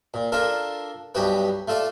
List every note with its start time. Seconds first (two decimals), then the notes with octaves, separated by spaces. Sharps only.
0.14 A#2
0.32 D4 F4 A4 A#4
1.15 B1 G2 F#4 G4 B4
1.68 A3 F4 A4 D5